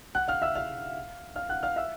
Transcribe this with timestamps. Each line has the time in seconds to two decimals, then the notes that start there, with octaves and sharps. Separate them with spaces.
0.15 F#5 F#6
0.28 F5 F6
0.42 E5 E6
0.55 F5 F6
1.36 F5 F6
1.49 F#5 F#6
1.63 F5 F6
1.76 E5 E6